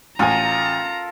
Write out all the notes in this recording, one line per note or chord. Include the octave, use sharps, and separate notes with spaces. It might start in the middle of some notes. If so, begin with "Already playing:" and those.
A1 F4 A4 A#4 G#5 A#5